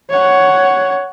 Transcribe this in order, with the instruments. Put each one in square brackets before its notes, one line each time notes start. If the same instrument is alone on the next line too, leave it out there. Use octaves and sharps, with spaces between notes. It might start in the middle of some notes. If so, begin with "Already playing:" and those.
[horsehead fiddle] C#5 F#5